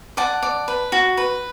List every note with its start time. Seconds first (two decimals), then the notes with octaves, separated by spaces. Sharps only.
0.17 D5 F#5 A5
0.43 D5
0.68 B4
0.92 F#4
1.17 B4